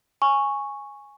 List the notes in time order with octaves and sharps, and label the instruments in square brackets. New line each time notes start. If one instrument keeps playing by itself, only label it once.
[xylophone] G#5 C#6